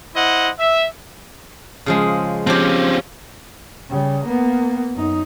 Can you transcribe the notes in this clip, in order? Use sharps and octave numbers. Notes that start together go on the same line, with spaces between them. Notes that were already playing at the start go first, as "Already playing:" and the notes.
E4 C5 D#5 F#5
E5
C#3 F3 G#3
F3 C4 C#4 G4
C#3 G3
A#3 B3
F#2 D#4